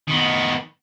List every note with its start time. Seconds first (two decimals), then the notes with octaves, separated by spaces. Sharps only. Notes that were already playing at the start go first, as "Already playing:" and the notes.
0.08 D#3 B3